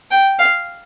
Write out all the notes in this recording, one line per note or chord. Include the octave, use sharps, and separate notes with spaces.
G5
F5